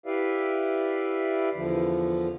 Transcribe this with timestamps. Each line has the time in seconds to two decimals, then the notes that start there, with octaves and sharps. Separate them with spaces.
0.06 E4 G4 B4 D5 E5 F5
1.55 E2 D3 F3